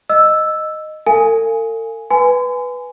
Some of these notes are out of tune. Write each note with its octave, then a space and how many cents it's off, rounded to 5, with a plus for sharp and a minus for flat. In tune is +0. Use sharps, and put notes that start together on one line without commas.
D#5 -5 E6 +0
A4 +45 F5 -10 G#5 +0
B4 +0 G#5 +0 C6 -45